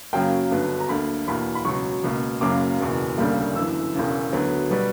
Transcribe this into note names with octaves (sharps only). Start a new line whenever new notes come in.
F#2 C#3 F#3 A#3 G5
G1 G2 F#3 B3
A#5
D2 D3 A#3 B5
E2 B2 A#3 B5
B5
C#2 B2 F#3 C#6
C#2 B2 A#3
F#1 F#2 C#3 F#3 A#3 D6
F#1 E2 B2
E1 D2 C#3 G3 A#3
G1 F#2 E3 E6
E1 E2 C#3
D2 D3 F#3 B3
B2 G3 B3